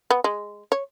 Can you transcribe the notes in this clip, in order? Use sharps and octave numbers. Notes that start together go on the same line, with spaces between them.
B3
G#3
C#5